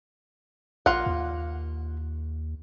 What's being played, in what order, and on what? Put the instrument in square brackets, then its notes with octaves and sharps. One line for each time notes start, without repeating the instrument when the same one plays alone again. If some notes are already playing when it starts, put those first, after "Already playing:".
[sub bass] A#1 [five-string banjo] A#3 F4 F#5
[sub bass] D#2